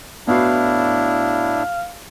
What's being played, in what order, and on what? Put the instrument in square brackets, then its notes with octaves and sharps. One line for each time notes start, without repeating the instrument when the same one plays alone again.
[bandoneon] A2 D4 E4 [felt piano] B3 F#4 [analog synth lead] F5